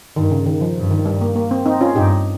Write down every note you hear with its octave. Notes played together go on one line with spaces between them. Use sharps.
G2 D#3
C#3
D#3
F3
G2
D#3
G3
A#3
A#3
C4
C4 D#4
C#4 F4
G2 D#4 G4